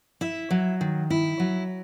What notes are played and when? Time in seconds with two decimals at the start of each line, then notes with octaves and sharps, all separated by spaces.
0.21 E4 E5
0.51 F#3
0.81 D#3
1.10 E4
1.40 F#3